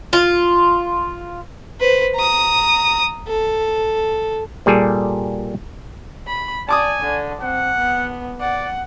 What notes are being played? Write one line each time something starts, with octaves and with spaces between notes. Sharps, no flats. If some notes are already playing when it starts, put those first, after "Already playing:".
F4
B4 C5
A#5 D#6
A4
A#2 G3 G#4 A4
B5
D5 G#5 A5 D6 D#6
D3
C4 F#5
B3
D5 F#5